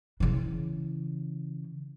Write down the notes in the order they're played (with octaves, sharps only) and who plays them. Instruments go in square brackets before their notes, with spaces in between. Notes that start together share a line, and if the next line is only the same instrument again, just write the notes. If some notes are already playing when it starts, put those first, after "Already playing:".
[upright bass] C#3 E3